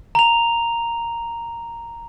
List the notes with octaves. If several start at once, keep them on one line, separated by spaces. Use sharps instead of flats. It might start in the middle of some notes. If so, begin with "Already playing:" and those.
A#5 F7